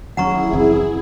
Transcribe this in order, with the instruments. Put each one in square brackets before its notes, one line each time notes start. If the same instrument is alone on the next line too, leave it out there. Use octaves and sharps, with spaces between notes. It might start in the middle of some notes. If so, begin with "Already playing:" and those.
[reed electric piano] D#2 F#3 C#4 [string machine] E4 G#4 [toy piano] F#5 A#5 C#6
[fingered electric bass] F1 E3 C4